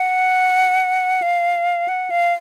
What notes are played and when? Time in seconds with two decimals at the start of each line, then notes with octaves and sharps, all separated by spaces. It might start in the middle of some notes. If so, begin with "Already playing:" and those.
Already playing: F#5
1.22 F5
1.88 F#5
2.10 F5